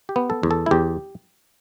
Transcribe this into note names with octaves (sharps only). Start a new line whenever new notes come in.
G4
B3
A4
E2
A4
E4
E2 G4